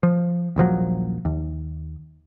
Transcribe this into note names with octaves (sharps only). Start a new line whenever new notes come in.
F3
D#1 A#1 F3 F#3
D#2